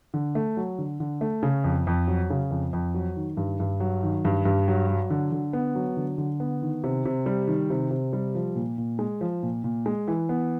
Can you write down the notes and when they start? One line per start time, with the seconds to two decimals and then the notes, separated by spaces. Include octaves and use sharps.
0.14 D3
0.35 A3
0.57 F#3
0.78 D3
1.00 D3
1.21 A3
1.43 C#3
1.64 F2
1.87 F2
2.07 F#3
2.30 C#3
2.51 F2
2.73 F2
2.94 F#3
3.16 D#3
3.37 G2
3.60 G2
3.80 F#3
4.03 D#3
4.25 G2
4.45 G2
4.68 F#3
4.89 F#3
5.10 D3
5.32 D3
5.53 B3
5.75 F#3
5.97 D3
6.18 D3
6.40 B3
6.62 D#3
6.84 C3
7.05 C3
7.26 G3
7.47 D#3
7.70 C3
7.91 C3
8.13 G3
8.35 F3
8.55 A#2
8.78 A#2
8.99 G#3
9.21 F3
9.43 A#2
9.64 A#2
9.86 G#3
10.08 E3
10.29 B3